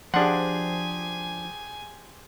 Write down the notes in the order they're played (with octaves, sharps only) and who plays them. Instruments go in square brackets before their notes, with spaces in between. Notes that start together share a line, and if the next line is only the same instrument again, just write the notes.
[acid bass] F3 [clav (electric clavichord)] D4 F#5 [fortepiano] G4 G#4 C6 [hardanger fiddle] G#5